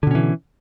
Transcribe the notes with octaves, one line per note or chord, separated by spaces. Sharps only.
B2 D3 E3 C#4